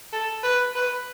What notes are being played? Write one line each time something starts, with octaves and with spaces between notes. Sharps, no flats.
A4
B4
B4